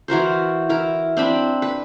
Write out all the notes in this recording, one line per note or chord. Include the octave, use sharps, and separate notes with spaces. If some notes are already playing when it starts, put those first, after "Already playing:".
E3 F#4 A#4 C5
E4 A#4
C4 D4 B5
B4